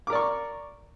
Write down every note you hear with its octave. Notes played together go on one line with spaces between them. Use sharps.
A#4 D5 C#6 D6